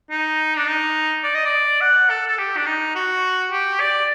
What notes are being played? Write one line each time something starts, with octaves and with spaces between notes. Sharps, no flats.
D#4
D4
D#4
D5
D#5
D5
F#5
A4
A4
G4
D4
D#4
F#4
G4
D5